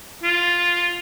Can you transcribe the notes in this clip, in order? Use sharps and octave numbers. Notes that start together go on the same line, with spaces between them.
F4